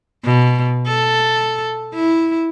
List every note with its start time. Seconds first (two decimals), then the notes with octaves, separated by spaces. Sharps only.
0.25 B2
0.87 A4
1.95 E4